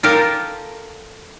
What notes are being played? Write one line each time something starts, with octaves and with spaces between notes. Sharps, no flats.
F4 G4 A4 A#4